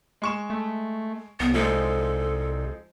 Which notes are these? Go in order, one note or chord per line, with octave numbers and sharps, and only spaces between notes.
G#3 C#6 E7
A3
C2 B3
F3 G#3 D#4 A4